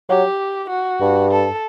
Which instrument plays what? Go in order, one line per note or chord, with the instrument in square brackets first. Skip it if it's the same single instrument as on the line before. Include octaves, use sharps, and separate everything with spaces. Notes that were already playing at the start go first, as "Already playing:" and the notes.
[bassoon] F#3 [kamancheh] G4
[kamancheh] F#4
[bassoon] G2
[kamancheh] A4